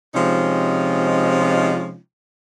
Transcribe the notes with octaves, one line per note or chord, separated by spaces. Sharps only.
C3 F3 G#3 C#4 D#4 F4